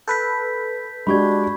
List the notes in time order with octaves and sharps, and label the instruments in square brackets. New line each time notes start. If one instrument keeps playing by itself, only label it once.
[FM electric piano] A4 B4 [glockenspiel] G6 B6
[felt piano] G#3 F#4 G4 [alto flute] D4 [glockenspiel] B5 C#6 G#6